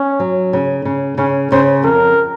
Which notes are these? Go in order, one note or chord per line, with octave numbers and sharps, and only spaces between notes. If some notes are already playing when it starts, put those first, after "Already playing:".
Already playing: C#4
F#3
C#3
C#3
C#3 C#4
C#3 C5
F2 A#4